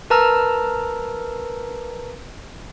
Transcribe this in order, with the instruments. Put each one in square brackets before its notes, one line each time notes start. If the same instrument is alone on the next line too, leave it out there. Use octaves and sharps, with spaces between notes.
[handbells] A#4 B4 A5 A#5 E6 F6